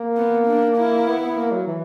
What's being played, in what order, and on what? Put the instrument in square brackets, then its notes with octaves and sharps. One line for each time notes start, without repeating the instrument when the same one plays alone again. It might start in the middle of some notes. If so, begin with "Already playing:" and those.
Already playing: [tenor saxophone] A#3
[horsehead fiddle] B3
D4
E4
[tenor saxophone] B3
B3
A#3
F#3
E3